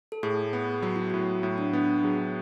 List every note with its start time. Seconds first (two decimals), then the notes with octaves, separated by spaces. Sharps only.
0.12 A4
0.23 A2 G#4
0.53 B3
0.82 F#3 F#4
0.96 E4
1.10 A2 F#4
1.43 A2 E4
1.58 D4
1.73 B3 D4
1.88 E4
2.04 F#3 G#4